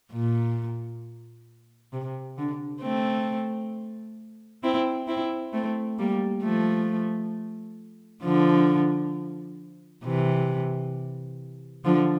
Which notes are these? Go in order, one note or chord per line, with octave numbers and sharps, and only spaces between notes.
A#2
C3
D3
A3 C4
C4 E4
C4 E4
A3 C4
G3 A#3
F3 A3
D3 F3
C3 E3
D3 F3